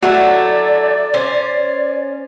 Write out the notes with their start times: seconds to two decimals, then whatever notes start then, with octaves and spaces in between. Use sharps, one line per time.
0.02 F#3 A3 E4 F#4 D5
1.14 C#4 C5